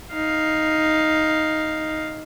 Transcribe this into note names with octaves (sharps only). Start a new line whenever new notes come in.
D#4 F5